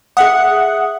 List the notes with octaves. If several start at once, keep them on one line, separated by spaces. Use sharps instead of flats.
G#4 E5 F#5 D#6